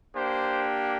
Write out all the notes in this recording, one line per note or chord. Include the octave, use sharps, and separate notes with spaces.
A#3 D4 G4 C5